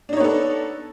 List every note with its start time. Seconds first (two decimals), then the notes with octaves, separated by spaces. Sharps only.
0.09 D4
0.13 D#4
0.17 C#5
0.20 B3
0.24 A4